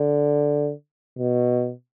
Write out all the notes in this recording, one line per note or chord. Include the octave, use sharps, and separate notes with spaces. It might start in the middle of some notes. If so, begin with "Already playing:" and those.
Already playing: D3
B2